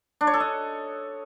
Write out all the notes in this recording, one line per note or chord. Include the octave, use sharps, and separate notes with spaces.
D4
C#5
A4
D#5